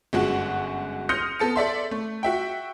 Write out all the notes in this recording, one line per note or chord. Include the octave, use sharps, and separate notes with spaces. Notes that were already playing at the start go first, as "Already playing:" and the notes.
G1 F#2 G#3 F#4 G#4 F#5
C6 D#6 F6 G6 A#6 C#7
B3 A4 A5 C#7
A4 D5 E5 C6
A3
F#4 E5 G5